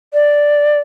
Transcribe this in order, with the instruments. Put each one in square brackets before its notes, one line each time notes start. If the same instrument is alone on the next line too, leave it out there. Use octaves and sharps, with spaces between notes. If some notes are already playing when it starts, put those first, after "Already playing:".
[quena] D5